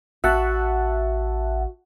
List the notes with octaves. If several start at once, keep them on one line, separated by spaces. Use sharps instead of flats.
A1 F#4 E5 F#5 A5